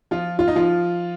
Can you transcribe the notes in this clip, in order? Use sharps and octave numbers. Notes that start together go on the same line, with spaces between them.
F3 F4
F4
D#4
F3 F4